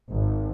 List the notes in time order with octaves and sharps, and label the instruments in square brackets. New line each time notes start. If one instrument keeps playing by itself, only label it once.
[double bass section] G#1